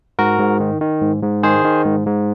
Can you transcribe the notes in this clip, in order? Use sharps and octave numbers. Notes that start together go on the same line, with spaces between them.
G#2 F#4 A#4
G#2
D#3
D#3
G#2
G#2
D#3 G#4 C5
D#3
G#2
G#2